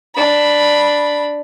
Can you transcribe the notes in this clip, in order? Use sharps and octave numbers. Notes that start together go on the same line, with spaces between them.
D4 B5